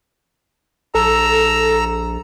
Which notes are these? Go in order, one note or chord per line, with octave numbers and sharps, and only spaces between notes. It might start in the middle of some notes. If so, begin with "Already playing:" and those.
A#1 A4 A#5 E6